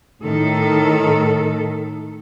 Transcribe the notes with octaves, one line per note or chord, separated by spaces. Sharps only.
A2 D#3 A4